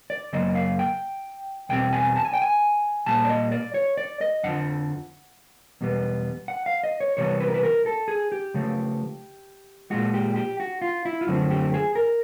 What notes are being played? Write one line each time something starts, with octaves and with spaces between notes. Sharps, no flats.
D5
F#2 C#3 F#3 A#3 D#5
F5
G5
E2 B2 G3 C4 G5
G#5
A5
G#5
G5
G#5
A#2 G3 A#3 A5
D5
D#5
D5
C#5
D5
D#5
F2 D3 F3 F#5
E2 B2 G3 B3
F#5
F5
D#5
C#5
C3 E3 G3 B3 C#5
B4
A#4
B4
A#4
A4
G#4
G4
C#3 F3 A3
A#2 F3 G#3 F#4
G4
G4
F#4
F4
E4
F4
F#2 D3 F3 A3 C4 F#4
G4
G#4
A#4